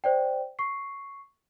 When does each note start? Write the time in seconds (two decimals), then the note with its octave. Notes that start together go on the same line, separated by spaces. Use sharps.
0.04 C5 D5 G5
0.59 C#6 C7